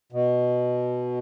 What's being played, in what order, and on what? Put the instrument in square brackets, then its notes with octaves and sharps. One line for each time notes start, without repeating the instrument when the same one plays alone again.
[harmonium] B2